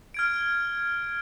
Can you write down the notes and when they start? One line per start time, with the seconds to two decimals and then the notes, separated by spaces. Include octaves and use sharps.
0.14 F6 G#6 D7